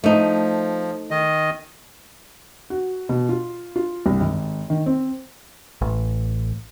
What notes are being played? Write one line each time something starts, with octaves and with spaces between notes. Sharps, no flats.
F3 A3 D#4
D#3 D#5
F#4
B2
F4
F4
C2
G#1
D#3
C4
A1